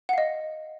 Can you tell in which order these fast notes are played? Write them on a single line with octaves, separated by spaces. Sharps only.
F#5 F5 D#5